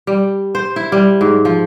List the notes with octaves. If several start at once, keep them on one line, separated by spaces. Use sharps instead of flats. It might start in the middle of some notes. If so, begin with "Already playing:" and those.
G3
C5
E4
G3
G#2
F3